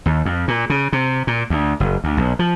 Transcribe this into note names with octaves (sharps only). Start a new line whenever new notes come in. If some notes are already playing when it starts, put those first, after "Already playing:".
D#2
F2
A#2
C#3
C3
A#2
D2
F#1
D2
B1
F3